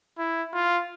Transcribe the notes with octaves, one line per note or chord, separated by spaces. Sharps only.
E4
F4